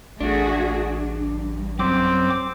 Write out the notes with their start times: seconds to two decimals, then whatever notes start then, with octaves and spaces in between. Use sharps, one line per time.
0.21 A1 A3 D4 F#4 G#4
0.97 G2
1.79 F#2 C4 D6